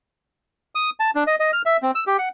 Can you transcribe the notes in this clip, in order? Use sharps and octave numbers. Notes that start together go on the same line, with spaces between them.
D#6
A5
D4
D#5
D#5
F6
E5
C4
E6
G4
F#5